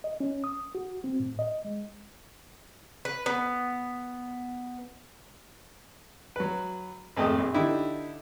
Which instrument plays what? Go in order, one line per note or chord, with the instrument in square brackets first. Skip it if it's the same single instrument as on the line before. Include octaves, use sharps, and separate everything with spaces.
[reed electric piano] D#5
C#4
D#6
F#4
C4
A2
D#5
G#3
[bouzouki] B4
B3
[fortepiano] F#3 B4
G#1 F2 A3 D#5 D#6
A#1
D3 D#4 E4 G4